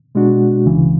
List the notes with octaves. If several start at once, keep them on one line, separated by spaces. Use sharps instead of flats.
B2 G#3 D4 F#4
C#2 C#3 E3